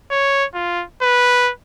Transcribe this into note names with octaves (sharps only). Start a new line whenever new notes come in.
C#5
F4
B4